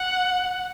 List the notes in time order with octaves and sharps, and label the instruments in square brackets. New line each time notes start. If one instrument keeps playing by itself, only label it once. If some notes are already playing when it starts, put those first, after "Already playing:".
Already playing: [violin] F#5